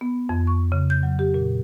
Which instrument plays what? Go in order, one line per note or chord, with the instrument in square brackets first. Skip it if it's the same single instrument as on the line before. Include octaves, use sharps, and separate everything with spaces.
[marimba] B3
F2
C#6
C#3
G6
F#3
G4
A#2